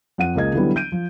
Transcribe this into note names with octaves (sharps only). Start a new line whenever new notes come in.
F2 F#5 D#7
C#2 A#3 G#4 D#5 G#6
D3 E3 F#3 G3 B3
G6 D7 D#7
F3